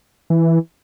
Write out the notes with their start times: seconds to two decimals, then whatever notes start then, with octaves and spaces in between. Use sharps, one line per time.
0.30 E3